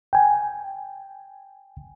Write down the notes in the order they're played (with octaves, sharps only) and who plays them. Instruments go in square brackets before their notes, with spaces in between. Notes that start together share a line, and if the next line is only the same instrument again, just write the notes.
[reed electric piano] G5 G#5